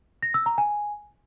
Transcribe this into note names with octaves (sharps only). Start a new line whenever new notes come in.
A#6
E6
A#5
G#5